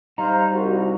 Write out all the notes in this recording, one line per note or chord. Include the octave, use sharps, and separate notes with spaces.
G3 D#4 C5 F5 A#5
C2 F#4